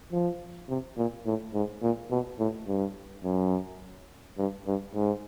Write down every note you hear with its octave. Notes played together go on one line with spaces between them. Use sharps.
F3
C3
A#2
A2
G#2
A#2
B2
A2
G2
F#2
G2
G2
G#2